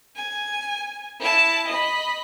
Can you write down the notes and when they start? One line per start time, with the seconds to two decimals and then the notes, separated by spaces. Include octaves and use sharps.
0.16 G#5
1.20 E4 A5
1.68 D#5 B5